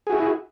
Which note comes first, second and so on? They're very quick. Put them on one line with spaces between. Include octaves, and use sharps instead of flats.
G#4 F#4 E4